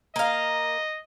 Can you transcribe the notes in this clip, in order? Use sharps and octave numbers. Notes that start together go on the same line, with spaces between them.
A#3 D#5 F5